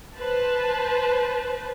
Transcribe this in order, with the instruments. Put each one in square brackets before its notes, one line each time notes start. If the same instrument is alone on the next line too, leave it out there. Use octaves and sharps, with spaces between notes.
[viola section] B4 C5 A5